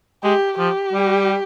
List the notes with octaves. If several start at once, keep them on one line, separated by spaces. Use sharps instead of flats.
G#3 G4
F3 G4
G3